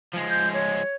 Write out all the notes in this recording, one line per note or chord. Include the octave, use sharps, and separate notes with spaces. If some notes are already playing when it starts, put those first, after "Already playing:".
F3 G#3
G6
C#5